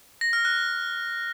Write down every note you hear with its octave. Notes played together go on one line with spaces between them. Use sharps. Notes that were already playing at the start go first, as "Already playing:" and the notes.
A#6
F6
F#6